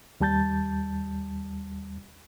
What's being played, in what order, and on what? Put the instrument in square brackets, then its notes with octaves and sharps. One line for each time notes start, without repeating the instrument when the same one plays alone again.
[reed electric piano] D#2 G3 A5 G6 A6